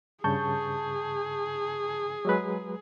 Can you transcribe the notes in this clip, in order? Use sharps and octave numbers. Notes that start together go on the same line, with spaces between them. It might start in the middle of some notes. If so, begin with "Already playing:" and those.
G2 C#3 G#4 A5 C#6 G6
F#3 G#3 B4